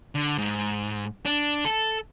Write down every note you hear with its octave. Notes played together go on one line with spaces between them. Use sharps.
D3
G#2
D4
A4